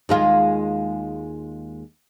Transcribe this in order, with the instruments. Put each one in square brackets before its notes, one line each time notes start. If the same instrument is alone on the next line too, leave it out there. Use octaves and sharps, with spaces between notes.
[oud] D#2 G#3 F4